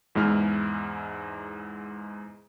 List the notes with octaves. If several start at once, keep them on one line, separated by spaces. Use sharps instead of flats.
E2 G#2 G#3 E4 F6